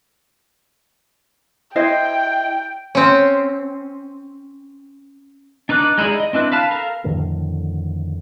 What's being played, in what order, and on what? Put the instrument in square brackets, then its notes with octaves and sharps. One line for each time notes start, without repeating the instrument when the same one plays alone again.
[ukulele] E4 C5 D#5 [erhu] G5
[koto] C4 C#4
[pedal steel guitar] D4 D#4 B4 D6 F#6
G#3 D#4 E4 G#4 D5
D#5
C4 D4 E4 B4
B4 F5 A5
A4 A#4 F5 A#5
[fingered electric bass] F2 A2 D3 D#3